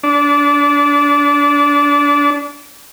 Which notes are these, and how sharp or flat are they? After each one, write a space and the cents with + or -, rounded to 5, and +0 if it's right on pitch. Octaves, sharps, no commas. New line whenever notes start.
D4 -25